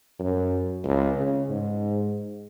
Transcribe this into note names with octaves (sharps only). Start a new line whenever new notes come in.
F#2
C#2
C#3
G#2